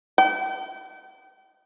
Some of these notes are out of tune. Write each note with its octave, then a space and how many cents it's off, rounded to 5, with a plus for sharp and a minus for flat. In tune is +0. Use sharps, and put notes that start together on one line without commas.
G5 -40